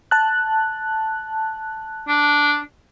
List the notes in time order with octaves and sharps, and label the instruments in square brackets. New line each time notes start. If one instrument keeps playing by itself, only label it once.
[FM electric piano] A5 F#6
[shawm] D4